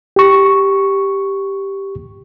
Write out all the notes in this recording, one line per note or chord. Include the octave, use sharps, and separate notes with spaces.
G4 C#6